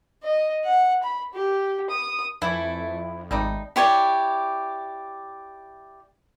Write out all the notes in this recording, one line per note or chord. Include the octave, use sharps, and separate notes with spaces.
D#5
F#5
B5
G4
D#6
F2 E3 A3 E4
G#1 G3 A3 D#4
E4 G4 C#5 D5